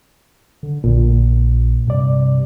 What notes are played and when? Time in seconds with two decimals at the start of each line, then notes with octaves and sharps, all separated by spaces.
0.63 D3
0.84 A#1 A#2
1.87 G2 C3 D5